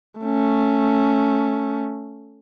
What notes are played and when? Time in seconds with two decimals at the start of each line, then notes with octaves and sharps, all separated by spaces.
0.20 A3 C#4